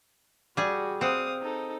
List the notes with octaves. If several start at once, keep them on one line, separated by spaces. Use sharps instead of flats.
G3 F#4 G#4
C4 F5 F#5 D#6
D#4 A4